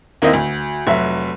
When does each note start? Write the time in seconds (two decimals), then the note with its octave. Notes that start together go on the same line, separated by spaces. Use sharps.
0.22 D#2 D#3 A#3 C4 E4 D#5
0.33 D2
0.87 F1 F#3 E5